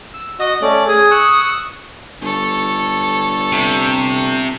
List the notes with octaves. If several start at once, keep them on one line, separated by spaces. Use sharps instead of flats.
E6
F#4 D#5
A3 C#4 D5
G#4 D#6
C#6 E6 F#6
G1 A4 C#5
C3